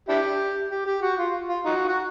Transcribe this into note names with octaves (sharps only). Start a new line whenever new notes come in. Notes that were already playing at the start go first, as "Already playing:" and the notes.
D4 E4 G4
G4
G4
F#4
F4
F4
D#4 F#4
F#4